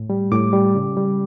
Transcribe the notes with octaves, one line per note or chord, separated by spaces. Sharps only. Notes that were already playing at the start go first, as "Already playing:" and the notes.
Already playing: A2
G3
A2 D6
G3
C#3
G3